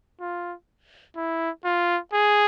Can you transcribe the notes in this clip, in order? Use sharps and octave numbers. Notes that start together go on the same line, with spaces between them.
F4
E4
F4
G#4